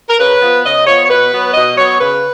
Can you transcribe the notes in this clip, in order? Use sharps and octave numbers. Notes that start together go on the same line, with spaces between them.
A#4
C#3 B4
F3 B3
C#3 D#5
F3 B3 C#5
C#5
B2 B4
F#3 B3
B2 D#5
F#3 B3 C#5
C#3 B4